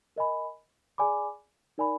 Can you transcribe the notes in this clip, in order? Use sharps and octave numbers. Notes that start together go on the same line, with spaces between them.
A#4 D#5 G#5 B5
G#4 D5 G#5 B5 D6
D#4 A#4 D5 G#5 B5